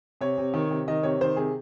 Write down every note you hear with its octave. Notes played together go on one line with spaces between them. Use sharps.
C3 C#5
C3
D#3
C3
D#3 D#5
C3 C#5
D#3 C5
C3 G#4